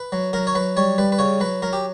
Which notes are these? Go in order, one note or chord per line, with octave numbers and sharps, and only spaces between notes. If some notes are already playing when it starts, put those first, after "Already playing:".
Already playing: B4
F#3
F#3 A#4
C#5
F#3 B4
G3 C#5
G3 B4
B4
C#3 C#5
F#3 B4
F#3 A#4
G4